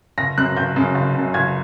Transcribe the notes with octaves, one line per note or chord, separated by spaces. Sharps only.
F#1 A#6
F#2 C#3 F#6
F#1 G6
F#2 C#3
F#1
F#2 C#3
F#1 G#6